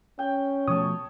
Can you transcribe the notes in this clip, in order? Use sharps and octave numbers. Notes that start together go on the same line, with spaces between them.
C#4 G5
B2 F3 A3 C#5 A5 D#6